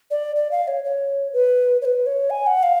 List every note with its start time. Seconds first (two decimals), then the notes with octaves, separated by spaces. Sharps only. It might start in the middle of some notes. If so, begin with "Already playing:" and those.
0.11 D5
0.36 D5
0.51 F5
0.68 C#5
0.84 C#5
1.33 B4
1.82 C#5
1.85 B4
2.06 C#5
2.30 G#5
2.47 F#5
2.63 F5